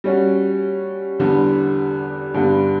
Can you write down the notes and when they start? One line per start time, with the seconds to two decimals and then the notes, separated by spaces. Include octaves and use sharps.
0.04 G3 C#4 F#4
1.19 E2 D3 G3 B3
2.34 G2 D3 G3 B3